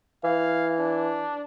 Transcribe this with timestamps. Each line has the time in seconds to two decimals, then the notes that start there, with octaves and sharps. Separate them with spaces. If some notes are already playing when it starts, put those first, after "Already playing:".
0.24 E3 F5
0.79 D4